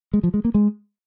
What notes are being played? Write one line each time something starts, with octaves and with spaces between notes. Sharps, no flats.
G#3
F3
G#3
A#3
G#3